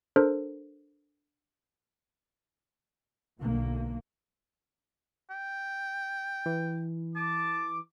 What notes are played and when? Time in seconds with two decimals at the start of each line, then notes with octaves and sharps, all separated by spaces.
0.16 D4 A4 A#4 C5
3.40 B1 B2 D3 A#3
5.30 G5
6.46 E3
7.15 A5 D6